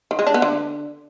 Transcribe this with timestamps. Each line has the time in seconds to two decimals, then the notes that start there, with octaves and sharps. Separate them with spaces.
0.11 D#3
0.19 G#3
0.27 D4
0.34 B3
0.42 D3